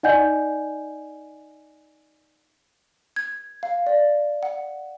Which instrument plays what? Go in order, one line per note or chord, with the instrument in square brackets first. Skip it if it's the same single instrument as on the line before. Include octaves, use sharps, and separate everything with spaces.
[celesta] D#4 D5 D#5 F#5 G#5 G6
[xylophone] G#6
F5
D5
F#5